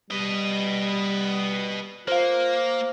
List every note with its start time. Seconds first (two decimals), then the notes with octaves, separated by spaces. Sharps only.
0.10 G3 B4 D#5
2.08 A#3 F4 C5 F5